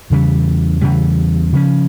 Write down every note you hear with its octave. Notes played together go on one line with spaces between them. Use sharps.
E2 C#3 E3 G3
E2 C#3 E3 G3
C#3 F3 C#4